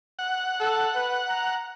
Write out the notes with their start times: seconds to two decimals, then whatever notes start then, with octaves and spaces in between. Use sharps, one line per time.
0.19 F#5
0.60 A4
0.95 B4
1.28 A#5